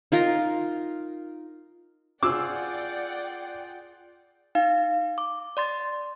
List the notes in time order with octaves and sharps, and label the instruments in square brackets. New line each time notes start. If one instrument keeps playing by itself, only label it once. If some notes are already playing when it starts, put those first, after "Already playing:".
[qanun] D#4 F4 A#4 A#5
[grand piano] F4 G#4 [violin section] D5 F#5 G5 [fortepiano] D6 E6
[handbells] D#4 F5
D6
D5 C6 A6